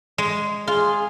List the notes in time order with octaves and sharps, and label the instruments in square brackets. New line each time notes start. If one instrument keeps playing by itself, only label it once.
[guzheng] G#3
[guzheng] F4 [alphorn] G#4